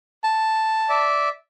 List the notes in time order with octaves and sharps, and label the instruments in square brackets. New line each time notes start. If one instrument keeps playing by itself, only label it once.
[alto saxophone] A5
[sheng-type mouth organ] D5 E5